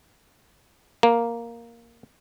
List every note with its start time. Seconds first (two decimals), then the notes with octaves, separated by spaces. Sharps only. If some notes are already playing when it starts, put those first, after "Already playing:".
1.03 A#3